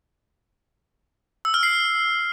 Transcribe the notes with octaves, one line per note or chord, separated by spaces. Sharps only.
E6
F6
C7